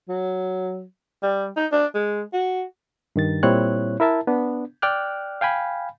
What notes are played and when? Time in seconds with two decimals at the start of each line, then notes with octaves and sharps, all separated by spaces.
0.09 F#3
1.23 G3
1.56 D#4
1.72 D4
1.95 G#3
2.33 F#4
3.16 G2 D#3 A6
3.43 A#2 G3 C4 E4 C#5 F#6
4.00 E4 A#4 E5 A5
4.27 B3 D4
4.82 D5 G5 D6 F6 F#6
5.41 F5 G5 G#5 B5